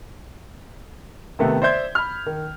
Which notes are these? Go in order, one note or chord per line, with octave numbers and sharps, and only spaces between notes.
C3 D#3 A3 B3
C5 D5 E5 C6 G6 G#6
B5 F6
D#3